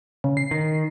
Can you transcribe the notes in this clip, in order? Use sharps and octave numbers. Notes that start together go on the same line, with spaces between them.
C#3
C7
D#3